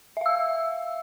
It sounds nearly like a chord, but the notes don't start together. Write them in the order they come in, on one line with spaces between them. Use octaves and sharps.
E5 F5 E6